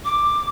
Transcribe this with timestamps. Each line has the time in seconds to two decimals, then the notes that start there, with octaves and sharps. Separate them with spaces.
0.05 D6